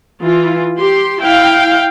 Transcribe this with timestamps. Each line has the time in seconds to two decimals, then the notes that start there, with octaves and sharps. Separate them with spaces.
0.22 E3 F4
0.78 G4 C6
1.20 E4 F5 G5